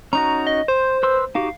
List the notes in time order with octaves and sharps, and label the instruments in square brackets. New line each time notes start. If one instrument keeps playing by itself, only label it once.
[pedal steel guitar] C#4 D#4 F#4 [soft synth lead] A#5
[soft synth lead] D#5
[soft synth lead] C5 [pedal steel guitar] C6
[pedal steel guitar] B4 C6 E6
[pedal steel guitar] D#4 F#4 G4 [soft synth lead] F5